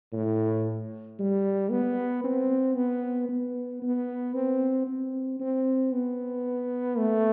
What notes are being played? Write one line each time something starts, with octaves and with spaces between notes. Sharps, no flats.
A2
G3
B3
C4
B3
B3
B3
C4
C4
C4
B3
A3